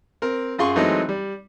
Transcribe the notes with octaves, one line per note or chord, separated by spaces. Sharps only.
C4 A#4
F#2 F4 G#4 C6 C#6
E3 F#3 G#3 A3 C4 D#4
G3